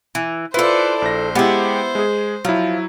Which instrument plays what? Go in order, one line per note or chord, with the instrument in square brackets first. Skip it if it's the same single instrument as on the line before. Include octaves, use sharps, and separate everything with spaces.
[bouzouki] E3
[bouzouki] E4 A4 [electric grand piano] F4 B4 [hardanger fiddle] C5 D5
[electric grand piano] A#1 A#6 [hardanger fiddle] C5
[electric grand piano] G#3 G4 [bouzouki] B3 E4
[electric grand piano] G#3 G#4
[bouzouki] F3 [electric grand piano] F#3 E4